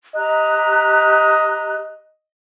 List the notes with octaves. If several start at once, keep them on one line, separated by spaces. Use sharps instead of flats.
G4 D#5 A#5 F#6